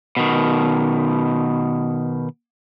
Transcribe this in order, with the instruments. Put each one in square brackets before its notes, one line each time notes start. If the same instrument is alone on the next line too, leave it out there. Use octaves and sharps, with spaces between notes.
[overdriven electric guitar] B2 D#3